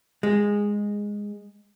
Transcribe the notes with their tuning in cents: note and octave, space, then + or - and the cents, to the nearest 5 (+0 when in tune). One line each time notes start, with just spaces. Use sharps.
G#3 -10